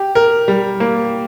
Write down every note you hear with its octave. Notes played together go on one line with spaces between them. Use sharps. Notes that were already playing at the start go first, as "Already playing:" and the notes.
Already playing: G4
A#4
G3
A#3